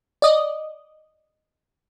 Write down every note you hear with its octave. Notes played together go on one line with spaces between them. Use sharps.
D5 D#5